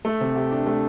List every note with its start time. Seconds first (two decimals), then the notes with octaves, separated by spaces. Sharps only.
0.05 A3
0.21 C3
0.36 G4
0.51 D4
0.67 A3